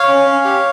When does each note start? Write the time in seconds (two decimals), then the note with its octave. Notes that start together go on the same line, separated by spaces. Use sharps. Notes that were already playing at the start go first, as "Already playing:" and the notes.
Already playing: C#5 F5
0.08 C#4
0.26 C#4
0.45 G4